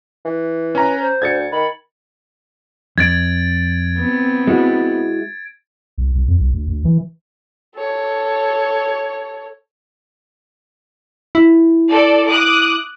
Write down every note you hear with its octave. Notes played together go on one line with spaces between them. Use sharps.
E3
C#4 B4 A#5
C5
D2 G#6 A6 C#7
D#3 B5
F2 G#6 A6 D7
B3 C4
G#3 E4 F#4
C2
C2
F2
C2
D2
D2
E3
A4 C#5
E4
A4 D5
D6 D#6 F#6